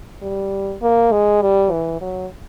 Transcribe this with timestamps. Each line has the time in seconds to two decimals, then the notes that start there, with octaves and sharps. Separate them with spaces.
0.22 G3
0.82 A#3
1.12 G#3
1.42 G3
1.71 E3
2.01 F#3